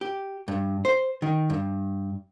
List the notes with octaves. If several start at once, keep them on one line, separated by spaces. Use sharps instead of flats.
G4
G2
C5
D#3
G2